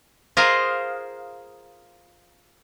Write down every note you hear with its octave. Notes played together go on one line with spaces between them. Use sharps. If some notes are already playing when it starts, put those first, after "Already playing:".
F4 G#4 A#4 C5 D#5 F5